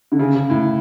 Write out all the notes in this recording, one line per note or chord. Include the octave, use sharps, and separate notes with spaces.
D3
C#3
C#3
A2